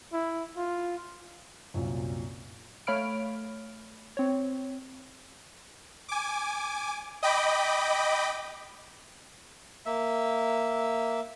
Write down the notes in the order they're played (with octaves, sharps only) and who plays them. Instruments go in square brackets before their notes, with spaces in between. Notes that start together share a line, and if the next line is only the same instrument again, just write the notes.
[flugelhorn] E4
F4
[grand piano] C2 F#2 A#2
[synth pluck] A3 C#5 F5 B5 F6 D7
C4 C#5
[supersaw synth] G#5 D6
D#5 G5 B5 D6
[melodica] A#3 E5